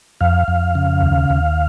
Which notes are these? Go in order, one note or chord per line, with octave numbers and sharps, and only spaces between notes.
F2 F5
F2
C#3
D#2
D#2